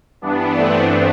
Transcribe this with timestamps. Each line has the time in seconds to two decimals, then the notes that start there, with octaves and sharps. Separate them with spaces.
0.21 G2 E3 B3 D4
0.56 A3 C4